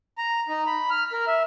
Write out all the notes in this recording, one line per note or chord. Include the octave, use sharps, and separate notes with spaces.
A#5
D#4
B5
F6
A#4
E5